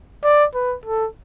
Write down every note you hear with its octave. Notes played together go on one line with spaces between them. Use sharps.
D5
B4
A4